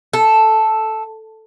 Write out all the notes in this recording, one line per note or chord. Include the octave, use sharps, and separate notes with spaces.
A4